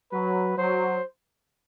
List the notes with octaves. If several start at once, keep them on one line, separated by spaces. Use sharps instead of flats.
F#3 B4
F#3 C5